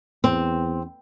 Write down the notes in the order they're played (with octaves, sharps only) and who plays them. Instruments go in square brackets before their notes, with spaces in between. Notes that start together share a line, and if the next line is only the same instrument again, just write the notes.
[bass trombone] E2 [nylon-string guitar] C4